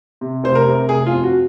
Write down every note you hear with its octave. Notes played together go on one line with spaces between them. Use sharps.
C3
F1 C5
A#4
C3
F1 G#4
F4
F2
F#4